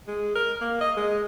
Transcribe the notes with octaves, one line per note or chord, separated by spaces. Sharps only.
G#3
A#4
A#3
D#5
G#3